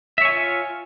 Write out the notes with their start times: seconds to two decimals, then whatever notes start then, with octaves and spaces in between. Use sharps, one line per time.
0.18 E5
0.21 C#5
0.25 G#5
0.29 F4